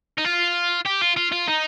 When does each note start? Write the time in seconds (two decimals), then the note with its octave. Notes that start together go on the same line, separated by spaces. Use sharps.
0.18 D#4
0.25 F4
0.86 G4
1.02 F4
1.17 F4
1.32 F4
1.48 D#4